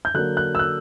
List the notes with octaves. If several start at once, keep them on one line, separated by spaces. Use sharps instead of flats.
G6
D3 F#3 A#3 F#6
F#6
E6
F#6